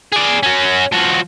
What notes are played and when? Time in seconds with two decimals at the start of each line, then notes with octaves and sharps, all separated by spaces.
0.13 G#4 D5
0.43 C#4 F#4
0.92 F3 F#4